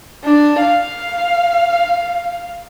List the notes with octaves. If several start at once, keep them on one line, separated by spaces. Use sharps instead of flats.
D4
F5